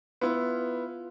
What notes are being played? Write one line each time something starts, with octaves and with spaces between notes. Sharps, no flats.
B3 E4 F4